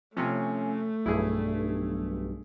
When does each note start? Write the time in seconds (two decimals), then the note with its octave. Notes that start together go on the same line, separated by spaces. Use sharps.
0.17 C3 F3 A3 C#4
1.06 B1 G2 E4 G#4